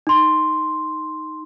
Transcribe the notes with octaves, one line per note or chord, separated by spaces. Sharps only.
D#4 C6